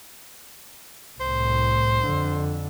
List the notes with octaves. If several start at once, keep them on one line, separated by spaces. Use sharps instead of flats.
C2 A2 C5
F2 D3